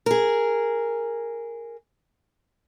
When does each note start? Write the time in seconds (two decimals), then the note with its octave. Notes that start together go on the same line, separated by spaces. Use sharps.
0.06 G#4 A#4